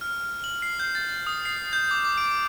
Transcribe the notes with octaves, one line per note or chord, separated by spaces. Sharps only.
F6
F#7
C7
G6
A6
D#6
C7
G6
D6
D6
D7